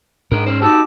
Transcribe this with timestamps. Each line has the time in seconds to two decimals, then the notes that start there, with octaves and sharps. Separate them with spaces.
0.32 G#2 D4 A#4
0.46 C#4 C5
0.62 D#4 F#4 G4 A5 D6 E6